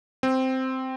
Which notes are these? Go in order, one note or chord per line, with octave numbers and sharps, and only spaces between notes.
C4